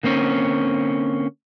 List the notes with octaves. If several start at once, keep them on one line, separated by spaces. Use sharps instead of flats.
D3 A#3 C4 C#4